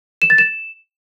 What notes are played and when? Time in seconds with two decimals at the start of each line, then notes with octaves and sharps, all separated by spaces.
0.22 E7
0.30 A6
0.38 E7